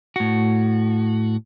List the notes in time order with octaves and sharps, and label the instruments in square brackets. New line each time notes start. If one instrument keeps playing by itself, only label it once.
[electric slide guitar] A2 F#4